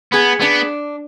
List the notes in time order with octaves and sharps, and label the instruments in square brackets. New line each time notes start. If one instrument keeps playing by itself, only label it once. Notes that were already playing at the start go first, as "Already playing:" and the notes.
[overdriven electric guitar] B3 [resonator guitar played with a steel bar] G#4
[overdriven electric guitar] B3 [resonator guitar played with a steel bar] D4